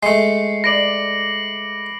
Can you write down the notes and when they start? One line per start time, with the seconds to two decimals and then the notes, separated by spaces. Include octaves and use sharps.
0.03 G#3 A3 C7 C#7
0.64 B4 D5 A#6 D7 F#7